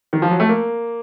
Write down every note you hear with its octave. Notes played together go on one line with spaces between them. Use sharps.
D#3
F3
F#3
A3
A#3